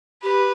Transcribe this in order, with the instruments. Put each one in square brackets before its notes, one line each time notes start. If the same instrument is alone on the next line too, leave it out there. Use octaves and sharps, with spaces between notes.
[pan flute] G4 [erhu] B4